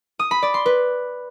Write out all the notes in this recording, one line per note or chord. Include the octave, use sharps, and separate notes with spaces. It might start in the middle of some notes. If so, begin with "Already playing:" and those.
D#6
B5
D5
C6
B4